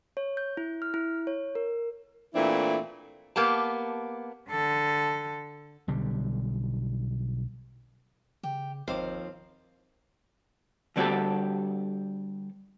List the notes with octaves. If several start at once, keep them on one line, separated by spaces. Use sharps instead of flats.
C#5
G6
E4
F6
E4
C#5
A#4
A#2 E3 A3 C4 D4 E4
A#3 B3 G4 A5
D3 A4
B1 D3 G3
C#3 G4
G1 D#2 F3 C4 C5 F5 D6
D3 G3 C4 F#4 G4 A4